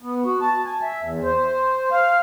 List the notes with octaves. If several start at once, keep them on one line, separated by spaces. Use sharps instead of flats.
B3
F#4
A5
G#5
E5
E2
C5
F5